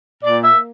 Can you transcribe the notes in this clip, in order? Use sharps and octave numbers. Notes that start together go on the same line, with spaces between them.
A#2 D5
A#3 E5